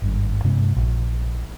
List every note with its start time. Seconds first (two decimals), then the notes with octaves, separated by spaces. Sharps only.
0.02 G#1 G2
0.44 G2 C3 G#3 C#4
0.76 A#1